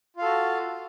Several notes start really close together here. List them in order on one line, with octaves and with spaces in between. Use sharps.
F4 F5 A4 F#4